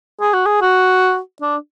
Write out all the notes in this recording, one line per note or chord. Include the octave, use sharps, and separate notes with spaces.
G#4
F#4
G#4
F#4
D4